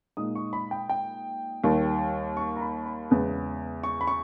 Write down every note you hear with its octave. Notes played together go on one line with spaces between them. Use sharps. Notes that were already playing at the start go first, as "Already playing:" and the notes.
A#2 G#3 D#4 D#6
C#6
B5
G5
G5
D#2 D#3 G3
C#6
A#5
B5
B5
E2 C#3 G#3 B3
C#6
B5
C#6